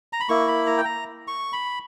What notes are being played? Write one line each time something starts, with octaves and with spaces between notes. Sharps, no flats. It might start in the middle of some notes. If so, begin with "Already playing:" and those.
A#5
B5
A#3 E4 C#6
B5
A#5
G5
A#5
C#6
B5